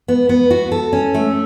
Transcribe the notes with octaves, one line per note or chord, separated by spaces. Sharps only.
B3
B3
F#4
A4
C#4
A3